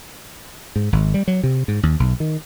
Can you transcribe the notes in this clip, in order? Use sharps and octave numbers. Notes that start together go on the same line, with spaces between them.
G#2
G#1
G3
F#3
C3
G#2
D#2
B1
D#3